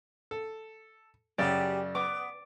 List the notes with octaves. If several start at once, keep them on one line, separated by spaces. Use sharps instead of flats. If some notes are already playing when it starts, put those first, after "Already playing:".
A4
F#2 C#3 G3 G4 D5
B3 D6